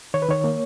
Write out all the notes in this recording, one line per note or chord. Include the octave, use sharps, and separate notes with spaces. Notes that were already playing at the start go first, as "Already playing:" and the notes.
D#3 C#5
B4
D#3 C#5
A#3